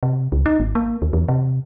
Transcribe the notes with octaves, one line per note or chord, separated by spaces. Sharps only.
C3
C#2
D#4
G#1
A#3
D#2
E2
C3